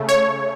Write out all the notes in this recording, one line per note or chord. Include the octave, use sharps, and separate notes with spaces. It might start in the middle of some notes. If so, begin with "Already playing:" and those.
Already playing: C#3 A3
C#5